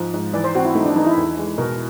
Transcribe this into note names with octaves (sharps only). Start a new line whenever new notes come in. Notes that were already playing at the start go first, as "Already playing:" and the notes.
Already playing: G#2 F3
G#2
E3 D5
C5
C4 F#4
E4
A3 D#4
D4
E3 D#4
E4
E2
G#3
B2 A#4